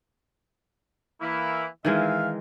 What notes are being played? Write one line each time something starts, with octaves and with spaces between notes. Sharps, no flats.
E3 A#3 E4
D#3 E3 G#3 E5 F5